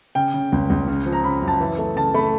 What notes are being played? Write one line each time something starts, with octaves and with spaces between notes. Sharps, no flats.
C#3 G5
C#3
C#2
C#2
C#3
F3
A#5
C#3 B5
F#2
A5
E3
A3
C#3 A5
A3 B5